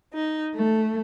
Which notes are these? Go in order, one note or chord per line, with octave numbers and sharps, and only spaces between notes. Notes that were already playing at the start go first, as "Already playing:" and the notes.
D#4
A3